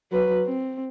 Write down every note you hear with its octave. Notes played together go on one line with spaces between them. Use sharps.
F#3 B4
C4